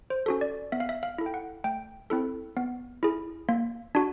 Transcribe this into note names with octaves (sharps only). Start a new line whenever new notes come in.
C5
C#4 F#4 A4
D5
B3 E5
F5
E5
F5
E4 A4
G5
F#5
A3 G5
C4 E4 A4
B3
E4 G#4
A#3
D4 F#4